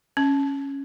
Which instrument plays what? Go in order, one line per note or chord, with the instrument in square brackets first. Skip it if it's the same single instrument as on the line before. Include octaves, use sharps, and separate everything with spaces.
[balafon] C#4